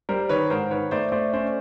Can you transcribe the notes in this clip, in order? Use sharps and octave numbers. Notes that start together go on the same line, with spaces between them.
G3 A#4 C5
D#3 B4 C#5
G#2 A#4 C5
D#3 B4 C#5
A3 C5 D5
A3 C5 D5
C#4 C5 D5